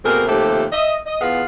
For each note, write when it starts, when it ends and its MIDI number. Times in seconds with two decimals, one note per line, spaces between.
0.05 0.24 47
0.05 0.24 57
0.05 0.24 58
0.05 0.24 60
0.05 0.24 68
0.05 0.24 70
0.27 0.64 39
0.27 0.64 48
0.27 0.64 53
0.27 0.64 57
0.27 0.64 67
0.27 0.64 69
0.73 0.94 75
0.73 0.94 76
1.06 1.18 75
1.21 1.43 40
1.21 1.43 59
1.21 1.43 65
1.21 1.43 68
1.21 1.43 77
1.21 1.43 78